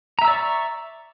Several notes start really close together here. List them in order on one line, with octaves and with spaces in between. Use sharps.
A#5 E5 E6 D5 C#6